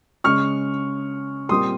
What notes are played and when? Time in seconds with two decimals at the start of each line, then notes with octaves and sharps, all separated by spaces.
0.24 C#3 G#3 C#4 C#6 F6
1.49 A#2 G3 C4 C6 D#6